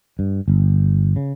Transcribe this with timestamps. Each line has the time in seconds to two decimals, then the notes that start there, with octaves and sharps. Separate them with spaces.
0.19 G2
0.48 G1
1.16 C#3